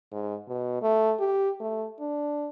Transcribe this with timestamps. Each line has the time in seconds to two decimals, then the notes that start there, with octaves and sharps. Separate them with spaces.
0.12 G#2
0.48 B2
0.82 A3
1.19 G4
1.60 A3
1.99 D4